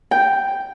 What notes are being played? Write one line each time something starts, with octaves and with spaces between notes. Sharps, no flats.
G5